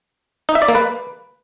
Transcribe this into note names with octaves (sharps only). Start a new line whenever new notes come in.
D#4
E5
D5
A#3
B4